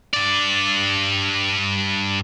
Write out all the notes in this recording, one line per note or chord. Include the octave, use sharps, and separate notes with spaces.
G2 D5